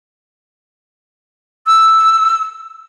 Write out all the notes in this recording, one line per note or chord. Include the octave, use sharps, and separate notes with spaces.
E6